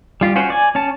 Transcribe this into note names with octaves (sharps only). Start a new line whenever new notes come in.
G3 F4 G4
C#4 F4 F#4 C5
D5 G#5
C#4 C#5 A5